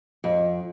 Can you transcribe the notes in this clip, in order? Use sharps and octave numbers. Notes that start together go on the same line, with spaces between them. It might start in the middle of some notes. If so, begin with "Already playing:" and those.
F2